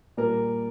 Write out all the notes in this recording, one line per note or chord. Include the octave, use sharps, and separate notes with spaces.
A#2 G3 A#4